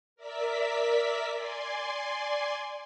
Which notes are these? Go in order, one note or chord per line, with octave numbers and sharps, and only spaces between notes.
A#4 D5 E5 B6
D5 G#5 C6